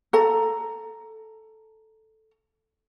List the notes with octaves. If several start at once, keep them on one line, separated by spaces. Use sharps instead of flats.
A4 A#5